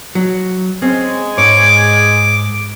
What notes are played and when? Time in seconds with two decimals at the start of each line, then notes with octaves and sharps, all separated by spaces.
0.15 F#3
0.82 G#3 C4 C#4 G#4
1.38 G#2 C#5 D6